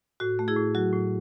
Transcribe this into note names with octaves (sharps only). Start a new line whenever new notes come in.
A2 F#4
A3
E4 G#4
A2
F#3 F#4
A2